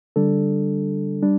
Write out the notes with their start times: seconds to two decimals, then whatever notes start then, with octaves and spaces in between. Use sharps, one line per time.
0.16 D3 G3 D4 A4
1.23 G3 D4